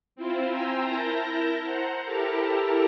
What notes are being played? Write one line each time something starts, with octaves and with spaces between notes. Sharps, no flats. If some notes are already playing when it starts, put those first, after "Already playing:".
C4 E4 F4 C5
G5 G#5 A#5 C6 E6
E4 A#4 A5 G6 A#6
C5 F#5 A#5
E4 G4 A4 A#4 A5 A#5